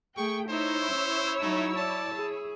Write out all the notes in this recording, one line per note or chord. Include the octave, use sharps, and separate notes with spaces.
A3 G#4 G5 C#6
D#4 E4 C5 C#5 E6
C#4
F#3 A3 D#4
D5 A5
G#4